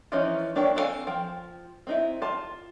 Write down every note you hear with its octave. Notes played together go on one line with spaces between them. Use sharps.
E3 F3 C#4 D#4 E4
A#3 D4 E4 C#5 G5
C4 A4 B4 F5 G#5
F3 G5
C4 D#4 E4
F4 A5